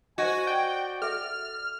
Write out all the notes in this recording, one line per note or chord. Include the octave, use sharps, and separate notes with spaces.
F#4 C5 D#5 G#5
D5 G5
A4 E5 F6